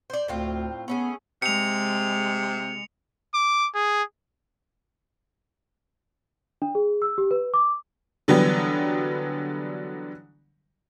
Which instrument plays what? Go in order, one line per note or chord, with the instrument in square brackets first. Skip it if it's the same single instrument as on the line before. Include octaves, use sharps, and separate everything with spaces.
[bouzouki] C5 D5
[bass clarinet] D2 [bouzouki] A2 C4 F4
[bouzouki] A3 C#4 G#4 [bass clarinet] B3
[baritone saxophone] C3 [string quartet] G#3 [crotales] C#7 F7
[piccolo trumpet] D6
G#4
[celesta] D4
G#4
E6
G4
B4
D6
[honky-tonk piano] D3 E3 F#3 G3 B3